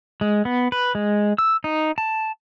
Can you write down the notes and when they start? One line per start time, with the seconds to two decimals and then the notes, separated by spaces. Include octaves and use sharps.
0.21 G#3
0.45 B3
0.72 B4
0.95 G#3
1.38 E6
1.64 D#4
1.98 A5